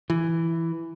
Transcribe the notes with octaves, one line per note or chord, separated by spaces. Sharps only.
E3